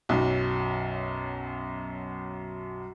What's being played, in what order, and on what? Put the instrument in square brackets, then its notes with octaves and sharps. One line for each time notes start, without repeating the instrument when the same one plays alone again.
[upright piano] B1 F#2